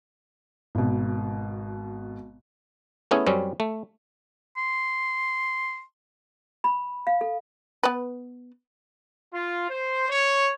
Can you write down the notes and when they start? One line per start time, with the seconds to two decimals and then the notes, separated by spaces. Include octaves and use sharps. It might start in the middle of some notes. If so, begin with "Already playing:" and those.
0.75 G#1 B2
3.11 A3 B3 C#4 E4 G#4
3.27 F#2 G3 C4 C#4
3.60 A3
4.57 C6
6.64 B5
7.07 F5
7.21 A4
7.83 B3 B4
9.33 F4
9.69 C5
10.09 C#5